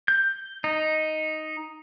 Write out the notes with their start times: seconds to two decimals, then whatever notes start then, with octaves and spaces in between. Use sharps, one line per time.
0.08 G6
0.64 D#4